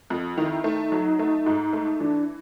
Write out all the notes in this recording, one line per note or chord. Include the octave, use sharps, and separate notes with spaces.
F2 F4
D#3 E4
A3 D#4
F#3
A3
G#2
A3
E3 D4